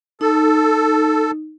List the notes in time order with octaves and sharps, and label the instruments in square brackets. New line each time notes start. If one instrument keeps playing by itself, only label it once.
[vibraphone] D#4 [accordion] A4